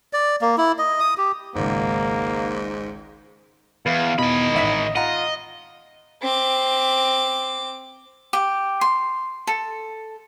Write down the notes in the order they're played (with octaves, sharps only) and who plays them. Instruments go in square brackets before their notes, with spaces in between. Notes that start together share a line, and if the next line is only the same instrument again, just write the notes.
[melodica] D5
A#3
E4
D#5
D#6
G4
[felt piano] G#1 C#2 [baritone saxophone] G#2 [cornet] A#3
[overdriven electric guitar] E2 [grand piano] B4 [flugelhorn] F5
[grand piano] E2 B2 [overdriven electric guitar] D#3 B5 [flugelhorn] D#5
[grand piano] A1 E5 B6
[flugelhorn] F4 [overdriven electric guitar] D#5 [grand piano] F#5 A#5
[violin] C4 D6
[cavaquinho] G4
C6
A4